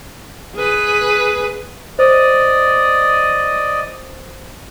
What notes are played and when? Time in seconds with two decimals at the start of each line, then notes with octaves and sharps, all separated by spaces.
0.56 G#4 B4
1.99 C5 D5 D#5